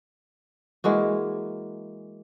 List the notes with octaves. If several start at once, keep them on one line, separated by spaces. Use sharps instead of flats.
E3 G#3 A#3 F#4